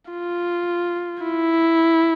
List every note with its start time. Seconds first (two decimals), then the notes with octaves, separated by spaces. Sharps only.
0.11 F4
1.23 E4